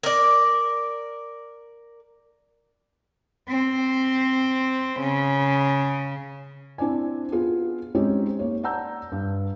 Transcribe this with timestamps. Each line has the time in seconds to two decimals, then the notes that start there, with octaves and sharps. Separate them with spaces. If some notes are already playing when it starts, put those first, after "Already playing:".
0.03 A#4 D5
3.49 C4
5.00 C#3
6.78 C4 D4 E4 D5 G#5
7.32 B3 F4 G#4
7.95 G#3 C4 C#4 D#4 G4
8.39 A#3 C#5
8.63 D5 F#5 A5 A#5 E6 G6
9.12 G2